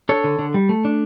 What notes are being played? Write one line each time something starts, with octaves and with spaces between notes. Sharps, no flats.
D4 A4 C#5
D3
D3
G3
A3
D4